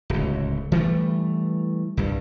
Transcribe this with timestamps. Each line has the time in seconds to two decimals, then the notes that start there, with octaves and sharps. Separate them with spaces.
0.10 D1 C#2
0.72 E3 G3 A3
1.97 C2 G2